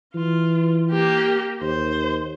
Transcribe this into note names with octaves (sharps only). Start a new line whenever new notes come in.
E3 F4
A#3 G4
D#2 C5